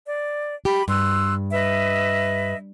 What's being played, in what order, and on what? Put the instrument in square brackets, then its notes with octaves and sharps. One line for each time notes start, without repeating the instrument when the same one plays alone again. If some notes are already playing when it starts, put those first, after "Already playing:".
[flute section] D5
[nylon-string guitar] G4 [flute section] B5
[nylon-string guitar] G2 [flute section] C6 E6 F#6
[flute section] B4 D#5 E5